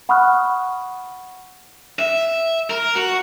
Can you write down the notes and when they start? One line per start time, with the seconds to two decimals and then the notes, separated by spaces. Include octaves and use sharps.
0.09 F#5 B5 C#6 D#6 F6 F#6
1.99 E5
2.70 A#4
2.95 F#4